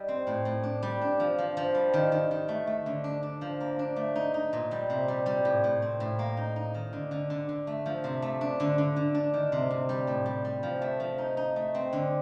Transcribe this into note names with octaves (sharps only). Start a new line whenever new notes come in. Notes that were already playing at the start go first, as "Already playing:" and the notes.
Already playing: G3 D#4
C4
A2
A2
D4
G3
D4
F3
F3
F3
G3
D#3
D#3
D#3
A3
A3
D3
D4
D4
F3
A#3
D4
A3
D#4
D#4
A#2
G3
C3
G3
G3
A2
A2
C4
A2
A#3
D#4
D#4
D#3
D3
D3
D3
D3
A3
F3
C3
A3
D4
D3
D3
D3
D4
D#3
C3
C3
G3
A2
G3
G3
F3
A3
F3
D#4
D#4
A3
C4
D3